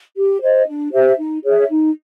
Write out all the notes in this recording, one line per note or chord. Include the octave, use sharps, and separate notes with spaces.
G4
C5 D#5
D4
G4 C5 E5
D#4
G#4 C#5 E5
D#4